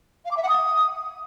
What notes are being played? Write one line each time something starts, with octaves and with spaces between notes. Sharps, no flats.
F5
D6
E5
F#5
D#6